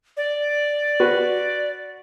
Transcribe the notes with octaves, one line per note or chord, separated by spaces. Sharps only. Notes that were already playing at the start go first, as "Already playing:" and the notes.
D5
F#4 B4